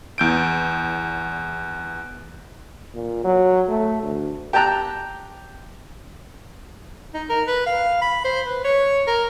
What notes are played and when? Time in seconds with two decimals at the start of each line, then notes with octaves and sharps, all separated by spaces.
0.18 E2 G6 D7
2.94 A#2
3.24 F#3
3.68 A3
4.03 D2
4.53 G4 G5 A5 A#5 F#6
7.14 D#4
7.30 A#4
7.47 B4
7.66 F5
8.02 B5
8.25 C5
8.46 B4
8.64 C#5
9.07 A#4